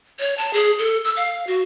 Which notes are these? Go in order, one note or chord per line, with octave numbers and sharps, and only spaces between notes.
C#5
A5
G#4
A4
E6
F5
F#4